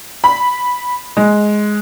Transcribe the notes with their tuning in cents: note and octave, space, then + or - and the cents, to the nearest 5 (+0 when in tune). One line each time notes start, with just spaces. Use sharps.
B5 -5
G#3 +5